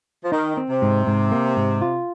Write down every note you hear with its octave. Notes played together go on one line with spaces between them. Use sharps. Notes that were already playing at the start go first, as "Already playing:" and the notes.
F3
D#3 D#4
C4
C3
G#2
G#2
A#3
G#2
F4